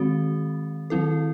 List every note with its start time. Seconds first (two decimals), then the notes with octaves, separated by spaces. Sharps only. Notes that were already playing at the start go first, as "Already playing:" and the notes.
Already playing: D#3 G#3 C4 F#4
0.90 D#3 F#3 C4 E4 A4